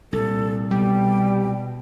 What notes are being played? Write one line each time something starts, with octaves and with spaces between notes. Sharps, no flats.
C2 A#2 A4
B2 G3 G5